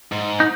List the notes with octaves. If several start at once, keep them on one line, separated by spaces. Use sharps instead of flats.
G#2
D#4